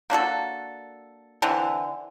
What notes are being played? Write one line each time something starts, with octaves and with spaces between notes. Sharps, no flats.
A#3 D4 F#4 A4
D3 E3 C4